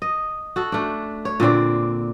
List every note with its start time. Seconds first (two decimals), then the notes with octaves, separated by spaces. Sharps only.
0.02 D#5
0.56 F#4 A4
0.72 A3 D4
1.25 C#5
1.40 A#2 D3 C4 D5